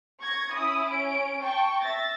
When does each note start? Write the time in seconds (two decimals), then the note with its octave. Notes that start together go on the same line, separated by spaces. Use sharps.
0.21 C#6 G#6 A#6
0.53 C#4 E4 D#6
0.89 C#4 D7
1.42 G5 A5 C#6
1.80 E5 A6 A#6